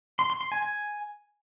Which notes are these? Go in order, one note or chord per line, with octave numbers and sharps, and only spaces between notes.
C6
C6
C6
G#5
G#5